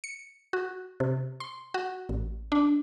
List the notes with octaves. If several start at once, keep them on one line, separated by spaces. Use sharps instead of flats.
C#7
F#4
C3
C6
F#4
A1
D4